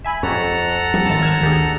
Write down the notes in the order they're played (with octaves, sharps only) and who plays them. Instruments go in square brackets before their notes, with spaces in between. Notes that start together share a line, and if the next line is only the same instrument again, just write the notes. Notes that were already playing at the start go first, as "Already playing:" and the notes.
[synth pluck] E5 G#5 B5
[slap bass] F2 [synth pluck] G4 C#5 [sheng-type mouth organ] A4 F#5 A#5
[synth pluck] F3 [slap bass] G3
[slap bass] G#1 F#2 [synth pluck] A5 A6
[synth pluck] E6 F6 G#6
[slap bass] D2 [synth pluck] D#3 G4 G#4